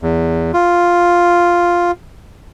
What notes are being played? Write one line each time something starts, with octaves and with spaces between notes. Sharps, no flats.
E2
F4